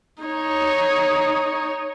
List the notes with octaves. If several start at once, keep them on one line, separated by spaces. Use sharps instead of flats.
D#4 C#5